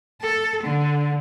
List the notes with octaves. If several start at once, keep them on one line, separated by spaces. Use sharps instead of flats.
A4
D3